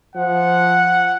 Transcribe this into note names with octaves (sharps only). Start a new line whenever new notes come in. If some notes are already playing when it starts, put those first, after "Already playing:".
F3 F#5